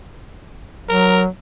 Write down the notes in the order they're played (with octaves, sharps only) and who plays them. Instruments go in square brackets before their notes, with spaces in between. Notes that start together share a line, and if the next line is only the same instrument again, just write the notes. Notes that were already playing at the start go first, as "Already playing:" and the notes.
[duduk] F#3 [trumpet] A#4